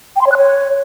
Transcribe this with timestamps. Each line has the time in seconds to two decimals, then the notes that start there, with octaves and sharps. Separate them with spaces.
0.16 G5
0.21 C6
0.26 C#5
0.32 F#6
0.37 C#5